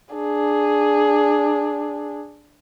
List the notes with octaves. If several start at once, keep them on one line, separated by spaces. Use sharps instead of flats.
D4 G#4